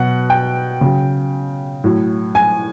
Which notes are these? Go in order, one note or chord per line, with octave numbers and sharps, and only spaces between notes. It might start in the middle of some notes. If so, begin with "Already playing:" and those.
Already playing: B2 F#3 F#5
G5
C#3 F#3
A2 F#3
G#5